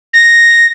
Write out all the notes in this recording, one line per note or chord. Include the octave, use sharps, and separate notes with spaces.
A#6